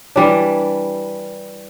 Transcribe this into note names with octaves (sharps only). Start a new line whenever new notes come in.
E3 G3 D4